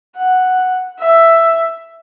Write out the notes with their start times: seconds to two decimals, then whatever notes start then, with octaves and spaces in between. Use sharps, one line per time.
0.16 F#5
0.99 E5